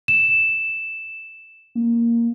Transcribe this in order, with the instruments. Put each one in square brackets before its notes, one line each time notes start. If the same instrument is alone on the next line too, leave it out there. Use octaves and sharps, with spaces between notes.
[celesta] E7
[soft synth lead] A#3